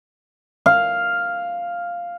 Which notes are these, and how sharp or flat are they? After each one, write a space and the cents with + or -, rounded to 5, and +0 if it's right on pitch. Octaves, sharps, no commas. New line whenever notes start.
F5 +0